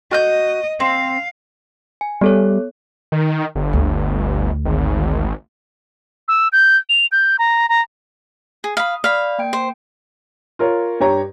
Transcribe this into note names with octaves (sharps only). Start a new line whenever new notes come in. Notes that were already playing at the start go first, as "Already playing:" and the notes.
F#4 D#5 F#6 G6
C4 F5
G#5
G3 B3 A4 C#5
D#3
G1
D2
G#1
E6
G6
F7
G6
A#5
A#5
G#4
F5 B5 D#6
D5 F5 B5
A#3 G5 D7
C5
F4 A#4 C#5
G2 G4 C#5 A#5